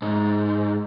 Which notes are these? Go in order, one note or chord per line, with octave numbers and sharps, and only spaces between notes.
G#2